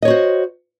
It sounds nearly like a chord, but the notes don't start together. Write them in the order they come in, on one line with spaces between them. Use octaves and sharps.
D#5 C#5 F#4 C5